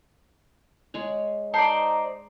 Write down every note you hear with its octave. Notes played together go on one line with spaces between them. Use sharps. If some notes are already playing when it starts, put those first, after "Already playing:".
G#3 G#4 C#5
D#4 C5 D5 A5